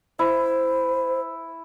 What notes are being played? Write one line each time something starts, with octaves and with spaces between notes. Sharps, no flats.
E4 C5